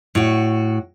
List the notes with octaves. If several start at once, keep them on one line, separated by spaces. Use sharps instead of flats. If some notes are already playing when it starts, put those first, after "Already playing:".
A2 F#4